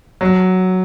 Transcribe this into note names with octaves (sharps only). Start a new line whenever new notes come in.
F#3